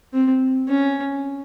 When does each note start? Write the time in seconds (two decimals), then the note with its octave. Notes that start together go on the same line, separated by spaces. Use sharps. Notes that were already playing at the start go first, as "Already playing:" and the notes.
0.13 C4
0.68 C#4